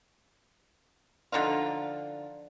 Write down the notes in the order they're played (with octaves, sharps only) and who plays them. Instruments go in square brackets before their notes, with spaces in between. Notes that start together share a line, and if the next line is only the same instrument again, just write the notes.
[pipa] D3 F3 D#4 F4